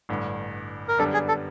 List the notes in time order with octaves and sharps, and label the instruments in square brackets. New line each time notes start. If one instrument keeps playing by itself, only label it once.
[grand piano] A1 G2 D3
[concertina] A#4
[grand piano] F#2 D3 G3 B3 D4 [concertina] A4
[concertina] G#4
A4